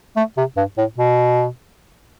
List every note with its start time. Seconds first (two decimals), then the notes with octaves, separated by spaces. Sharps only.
0.16 A3
0.37 C3
0.56 G2
0.77 A2
0.98 B2